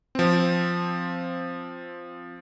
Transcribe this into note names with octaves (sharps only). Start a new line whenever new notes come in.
F3 C4